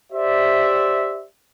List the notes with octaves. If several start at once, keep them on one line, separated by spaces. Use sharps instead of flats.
G4 C5 D5 E5